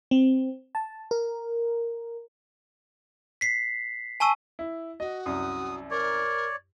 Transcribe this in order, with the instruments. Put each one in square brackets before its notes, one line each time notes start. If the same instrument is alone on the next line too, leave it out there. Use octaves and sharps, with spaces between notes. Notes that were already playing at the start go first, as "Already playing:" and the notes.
[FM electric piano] C4
A5
A#4
[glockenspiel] B6 C7
G#5 A5 C#6 E6 D#7
[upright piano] E4
[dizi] F#4 [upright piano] D#5
[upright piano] C2 F#2 [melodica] D#6
[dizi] A#4 [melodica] C#5 D5